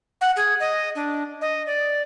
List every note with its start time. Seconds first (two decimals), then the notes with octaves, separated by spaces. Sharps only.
0.21 F#5
0.36 G#4
0.60 D#5
0.95 D4
1.41 D#5
1.67 D5